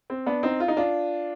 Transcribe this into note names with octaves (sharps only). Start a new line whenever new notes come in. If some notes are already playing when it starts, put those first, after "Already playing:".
C4
B3 D4
C4 D#4
F4
D#4
D4 F4